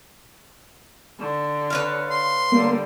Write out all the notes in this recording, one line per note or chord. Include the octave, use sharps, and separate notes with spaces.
D3
B4 C#5 F5
C6
D3 G3 A#3